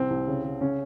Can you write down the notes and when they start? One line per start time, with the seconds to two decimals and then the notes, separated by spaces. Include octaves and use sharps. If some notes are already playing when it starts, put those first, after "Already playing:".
Already playing: C2 C4
0.10 C2
0.27 C#3
0.44 C#3
0.61 C#3 C#4